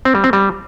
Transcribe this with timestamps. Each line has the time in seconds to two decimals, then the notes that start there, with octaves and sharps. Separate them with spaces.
0.05 C4
0.15 G3
0.24 C4
0.33 G3